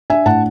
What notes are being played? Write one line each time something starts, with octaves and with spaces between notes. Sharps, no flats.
D4 E5 G#5
A2 F#5 A5